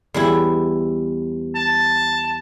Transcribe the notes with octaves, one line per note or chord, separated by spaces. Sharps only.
E2 G3 E4
A5